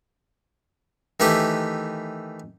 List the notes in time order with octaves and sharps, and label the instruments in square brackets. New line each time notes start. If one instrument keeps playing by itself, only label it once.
[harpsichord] D#3 E3 A3 G4 B4